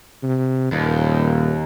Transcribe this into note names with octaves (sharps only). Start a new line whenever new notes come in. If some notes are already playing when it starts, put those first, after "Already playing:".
C3
D#1 D#2